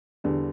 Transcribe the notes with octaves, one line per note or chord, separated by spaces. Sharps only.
E2 D3 G3